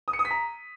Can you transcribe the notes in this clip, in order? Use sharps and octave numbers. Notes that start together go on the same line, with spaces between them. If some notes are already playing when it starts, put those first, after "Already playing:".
D#6
C#7
D#6
B6
A#5